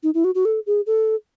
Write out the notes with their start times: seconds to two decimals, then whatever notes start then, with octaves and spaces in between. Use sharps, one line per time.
0.03 D#4
0.14 E4
0.24 F#4
0.35 F#4
0.45 A4
0.66 G#4
0.87 A4